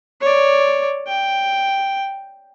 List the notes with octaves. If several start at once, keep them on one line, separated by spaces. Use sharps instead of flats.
C#5 D5
G5